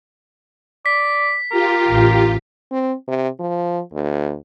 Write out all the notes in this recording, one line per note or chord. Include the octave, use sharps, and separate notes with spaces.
D5 B6
F4 G4 A#4
A1
C4
C3
F3
D2